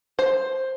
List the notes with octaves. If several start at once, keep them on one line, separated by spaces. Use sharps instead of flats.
C5